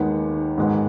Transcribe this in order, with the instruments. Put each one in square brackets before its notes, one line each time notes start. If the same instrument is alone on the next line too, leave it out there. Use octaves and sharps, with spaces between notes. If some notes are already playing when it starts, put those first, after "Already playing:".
Already playing: [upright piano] D#2 D#3 G#3 B3
G#2 D#3 G#3 B3